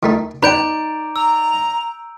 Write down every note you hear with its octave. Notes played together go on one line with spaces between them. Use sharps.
D#3 A3 D#4
D#4 B4 D5 G5 A#5 G6 D7 F7
A#5 E6